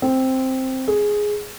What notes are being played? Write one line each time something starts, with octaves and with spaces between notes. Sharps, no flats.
C4
G#4